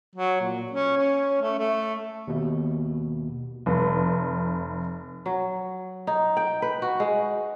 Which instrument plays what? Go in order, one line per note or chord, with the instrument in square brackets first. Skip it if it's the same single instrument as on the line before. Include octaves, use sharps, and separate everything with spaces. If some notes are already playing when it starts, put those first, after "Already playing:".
[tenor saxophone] F#3
A#2
C#4
C#4
A3
A3
[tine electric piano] D#2 B2
[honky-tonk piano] F1
[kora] F#3
D#4
G5
B4
F#4
G#3